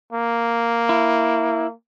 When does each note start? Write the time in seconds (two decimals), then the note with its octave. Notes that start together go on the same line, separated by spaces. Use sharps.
0.13 A#3
0.89 E4